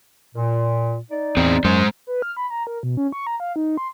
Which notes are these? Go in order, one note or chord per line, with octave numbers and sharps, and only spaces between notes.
A#2
D#4 D5
E2 C4 G#4
F#2 G#3 C5
B4
F6
B5
A#5
A#4
B2
C#4
C#6
A#5
F5
D#4
C6